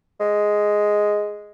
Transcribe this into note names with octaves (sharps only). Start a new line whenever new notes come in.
G#3